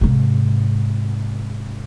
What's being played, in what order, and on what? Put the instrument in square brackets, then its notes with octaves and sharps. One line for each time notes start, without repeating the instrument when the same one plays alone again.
[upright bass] G#2 C3